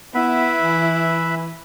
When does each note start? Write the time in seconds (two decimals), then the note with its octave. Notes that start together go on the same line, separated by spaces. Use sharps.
0.14 B3 E4 B4 E5 B5
0.61 E3